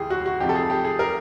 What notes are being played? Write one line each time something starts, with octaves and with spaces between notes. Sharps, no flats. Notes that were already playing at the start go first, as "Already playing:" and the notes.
Already playing: D2 E3 G4 G#4
F#4
F#4
F2 C3 F3 G4
A4
G#4
G4
G#4
A#4